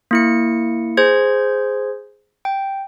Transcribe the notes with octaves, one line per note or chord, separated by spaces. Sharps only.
A#3 E4 C#7
G#4 C5 G#6
G5